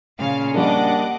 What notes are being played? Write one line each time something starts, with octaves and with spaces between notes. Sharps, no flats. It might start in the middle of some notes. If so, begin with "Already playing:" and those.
A#2 C#3 F5
G3 A#3 D4 D#5 F#5 D6